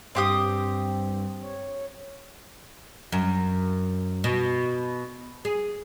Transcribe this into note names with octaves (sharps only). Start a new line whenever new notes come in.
G2 C4 G4 D#6
C#5
F#2
B2
G#4